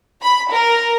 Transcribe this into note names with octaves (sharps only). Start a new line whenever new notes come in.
B5
A#4